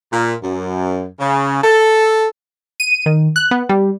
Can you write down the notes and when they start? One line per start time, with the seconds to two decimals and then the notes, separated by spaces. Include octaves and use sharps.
0.12 A#2
0.42 F#2
1.20 C#3
1.63 A4
2.80 D#7
3.06 D#3
3.36 F#6
3.51 B3
3.69 G3